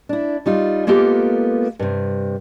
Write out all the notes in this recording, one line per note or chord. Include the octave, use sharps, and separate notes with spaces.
D4 E4
G3 D#4 F4
G#3 A#3 B3 F4 G4 A4
G2 C3